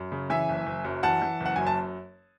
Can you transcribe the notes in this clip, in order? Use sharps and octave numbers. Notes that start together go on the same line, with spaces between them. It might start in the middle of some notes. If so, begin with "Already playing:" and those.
Already playing: F#2
C#3
E3 E5 G#5
F#1
F#1
F#2
E3 F#5 A5
E3
F#1
F#5
F#2 G#5
A5